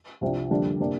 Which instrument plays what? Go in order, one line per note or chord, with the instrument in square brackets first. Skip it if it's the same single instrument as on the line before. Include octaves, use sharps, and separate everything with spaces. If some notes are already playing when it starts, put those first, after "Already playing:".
[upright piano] C2 C3 F3 D4
F2 D3 G3 A#3 D4
C3 A#3 D4 G4